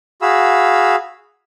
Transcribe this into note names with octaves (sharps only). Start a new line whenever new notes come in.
F#4 G#4 F5 B5 E6